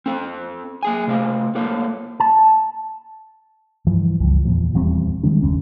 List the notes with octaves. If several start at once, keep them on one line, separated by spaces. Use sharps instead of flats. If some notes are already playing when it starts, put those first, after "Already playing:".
C4 A4
A#3 G#4 G#5
C3 A3 D#5 F5
G#3 A#3 A4 C#5 F5
A5
G2 E3 F3
G1 C#2 G2 F3
E2 A#2 F3
D#1 E2 G3 C4
D#3 G3 G#3 D4
F#1 D#2 C#4